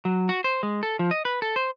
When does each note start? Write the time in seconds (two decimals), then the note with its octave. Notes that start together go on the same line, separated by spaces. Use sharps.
0.05 F#3
0.29 F#4
0.44 C5
0.63 G#3
0.83 A4
0.99 F3
1.11 D#5
1.25 B4
1.42 A4
1.56 C5